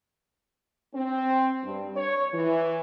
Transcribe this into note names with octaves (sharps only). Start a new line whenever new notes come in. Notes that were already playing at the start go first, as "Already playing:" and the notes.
C4
G2
C#5
E3